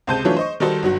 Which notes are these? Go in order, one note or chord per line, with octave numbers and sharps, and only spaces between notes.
C#2 C3 C5 A5 G6 D#7
E3 F#3 A3 D4 F4 C#5
C5 D#5 C#6
D#3 G3 D#4 F#4 A4 C5
G1 F#3 F#4